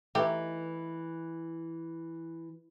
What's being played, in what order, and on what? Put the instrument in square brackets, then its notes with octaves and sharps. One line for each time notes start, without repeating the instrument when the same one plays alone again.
[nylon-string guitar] E3 [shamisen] A3 D#4 G4